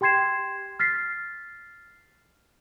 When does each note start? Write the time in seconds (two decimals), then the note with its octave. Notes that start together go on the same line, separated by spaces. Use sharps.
0.01 G4 G5 C6 G#6 C7 E7
0.80 F6 A6 B6 C7